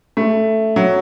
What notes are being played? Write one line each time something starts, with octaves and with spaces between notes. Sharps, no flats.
A3
F#3